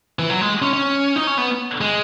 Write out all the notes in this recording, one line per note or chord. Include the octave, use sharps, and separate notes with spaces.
E3
F#3
G#3
C#4
C#4
D#4
C#4
B3
G#3